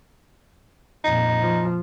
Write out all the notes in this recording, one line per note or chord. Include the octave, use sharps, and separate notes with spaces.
F2 A#2 D#4
F3